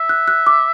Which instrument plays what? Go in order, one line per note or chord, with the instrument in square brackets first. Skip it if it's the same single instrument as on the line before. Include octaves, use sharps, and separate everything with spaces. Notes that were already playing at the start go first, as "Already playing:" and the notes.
Already playing: [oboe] E5
[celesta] F#6
F#6
D6